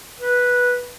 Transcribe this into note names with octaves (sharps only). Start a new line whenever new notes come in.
B4